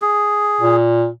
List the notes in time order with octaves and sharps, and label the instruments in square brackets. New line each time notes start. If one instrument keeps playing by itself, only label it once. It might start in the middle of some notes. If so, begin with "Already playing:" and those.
[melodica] G#4
[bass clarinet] A#2